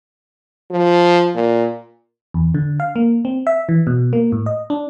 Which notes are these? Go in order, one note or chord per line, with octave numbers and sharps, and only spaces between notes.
F3
A#2
E2
D3
F5
A#3
C4
E5
E3
B2
A#3
A2
D#5
D4